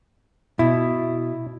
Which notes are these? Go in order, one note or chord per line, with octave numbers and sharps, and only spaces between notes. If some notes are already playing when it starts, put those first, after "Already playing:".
B2 E4